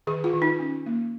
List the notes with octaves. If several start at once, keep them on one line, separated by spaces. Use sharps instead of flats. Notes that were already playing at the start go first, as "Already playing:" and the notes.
D#3 G#4
F4
D#3
D#4
C#4
A#3